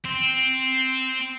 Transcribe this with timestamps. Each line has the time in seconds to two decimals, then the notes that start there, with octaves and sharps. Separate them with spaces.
0.05 C4